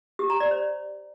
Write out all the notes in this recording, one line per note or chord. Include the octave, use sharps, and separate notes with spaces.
G4
A#5
D5
C5